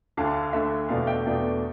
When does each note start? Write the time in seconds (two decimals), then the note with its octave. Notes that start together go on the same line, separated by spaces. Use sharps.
0.17 D2 D3 A3 F5 A5
0.53 D2 D3 A3 E5
0.89 E2 B2 A3 D4 F5
1.07 E5 G5
1.26 E2 B2 A3 D4